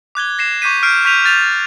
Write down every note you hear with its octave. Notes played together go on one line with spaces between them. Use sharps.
D6 F#6 G#6 G7
A#6 C7 E7
C#6 D6 G6 B6 D#7
F6 G6 C7 D7
C#6 G6 B6 D#7 F7
F6 G6 A6 D#7 F7